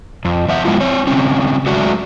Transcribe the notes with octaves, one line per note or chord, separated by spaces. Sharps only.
F2
F3 E5 F#5
G#3 A#3 B3 E4 F4
C4 C#5
C#3 G3 C4 C#4
F#3 G#3 A3 D4 F#4 E5